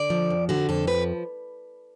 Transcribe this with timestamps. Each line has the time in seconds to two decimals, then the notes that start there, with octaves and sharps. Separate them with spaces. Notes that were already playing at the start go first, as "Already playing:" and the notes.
Already playing: D3 D5
0.10 F3
0.30 F2
0.49 D3 F#4
0.69 F2 A4
0.87 F3 B4